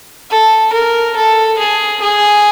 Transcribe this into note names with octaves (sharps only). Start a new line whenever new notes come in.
A4
A#4
A4
G#4
G#4